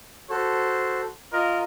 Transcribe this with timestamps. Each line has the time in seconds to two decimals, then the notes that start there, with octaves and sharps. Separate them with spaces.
0.30 F#4 A4 C5
1.33 F4 A#4 D#5